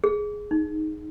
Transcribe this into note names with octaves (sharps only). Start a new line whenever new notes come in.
G#4
D#4